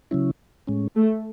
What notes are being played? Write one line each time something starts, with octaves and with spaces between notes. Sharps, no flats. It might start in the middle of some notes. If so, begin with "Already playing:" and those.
C#3 F#3 C#4 E4
A2 G#3 C#4
A3